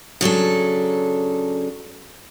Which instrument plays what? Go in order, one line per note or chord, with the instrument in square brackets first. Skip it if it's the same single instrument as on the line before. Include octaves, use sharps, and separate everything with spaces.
[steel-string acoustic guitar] C#3 F#3 D4 A4